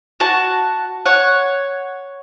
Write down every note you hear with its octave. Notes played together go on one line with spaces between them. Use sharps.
F#4 A5
C#5 F#5